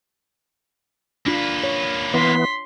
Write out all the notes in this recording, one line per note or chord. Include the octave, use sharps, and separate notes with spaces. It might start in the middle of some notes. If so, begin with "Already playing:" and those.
A#3 D4 F4 B4
C#5
E3 B3 C6 B6